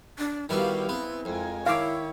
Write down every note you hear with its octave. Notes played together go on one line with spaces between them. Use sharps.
D4
D#3 G3 B3 E4 F#4 G4 F5
B3 C4 G#4
F2 G#3 A#4 G#5
D#3 E4 C#5 F5 D6